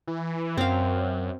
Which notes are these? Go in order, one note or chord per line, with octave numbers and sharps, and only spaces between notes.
E3
F#2 C4 F5